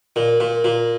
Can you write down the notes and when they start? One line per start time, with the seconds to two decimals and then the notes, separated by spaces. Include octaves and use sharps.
0.16 A#2
0.40 A#2
0.64 A#2